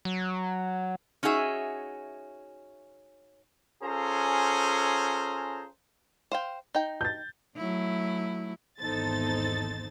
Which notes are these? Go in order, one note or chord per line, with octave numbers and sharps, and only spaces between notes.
F#3
C#4 D#4 F#4 G#4 E5
C#4 F4 G#4 A4 C5 A#5
C5 F5 G5
D#4 G5
G6 A6
F#3 A3 E4
G#1 E2 D#4 A4 C5 A6